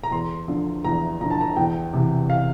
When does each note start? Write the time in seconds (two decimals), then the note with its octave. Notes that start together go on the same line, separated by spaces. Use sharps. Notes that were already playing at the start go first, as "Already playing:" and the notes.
0.04 A#5
0.11 E2 C6
0.48 D3 F3
0.84 E2 A#5
1.21 D3 F3 A#5
1.31 A5
1.41 A#5
1.56 E2 G5
1.93 C3 E3
2.30 F5